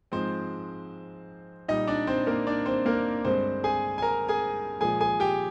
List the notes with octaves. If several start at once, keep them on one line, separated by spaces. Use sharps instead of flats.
G#2 F3 G#3 C4 C5
A#2 G3 D#4 D#5
D4 D5
C4 C5
A#3 A#4
D4 D5
C4 C5
A#3 A#4
G2 D3 G#3 C4 C5
G#4 G#5
G#5
A#4 A#5
G#4 G#5
A#2 F3 G#3 G#4 G#5
G#4 G#5
G4 G5